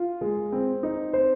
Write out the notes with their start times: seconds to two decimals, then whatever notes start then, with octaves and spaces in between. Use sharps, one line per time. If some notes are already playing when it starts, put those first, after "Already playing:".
Already playing: F4
0.21 G#3
0.52 C4
0.83 D#4
1.13 C5